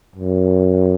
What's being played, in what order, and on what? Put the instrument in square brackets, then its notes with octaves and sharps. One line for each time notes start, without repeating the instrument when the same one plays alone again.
[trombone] F#2